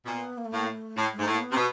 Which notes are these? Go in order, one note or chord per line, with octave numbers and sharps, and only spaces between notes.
B2
A#2 B3
A#3
A3
A2 A#3
A3
A2
G#3
G#2 A3
A2
A#3
B3
C3
B2